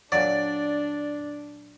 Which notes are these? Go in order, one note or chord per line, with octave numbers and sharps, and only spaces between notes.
A#2 F#3 D4 D5